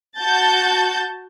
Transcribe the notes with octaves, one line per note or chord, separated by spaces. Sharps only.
F#4 A5 G6 A6